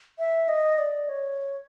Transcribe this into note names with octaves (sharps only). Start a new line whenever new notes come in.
E5
D#5
D5
C#5